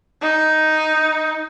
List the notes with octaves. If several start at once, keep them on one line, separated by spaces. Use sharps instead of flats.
D#4